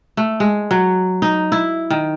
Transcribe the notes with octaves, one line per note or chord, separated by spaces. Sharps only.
A3
G#3
F#3
D#4
E4
D#3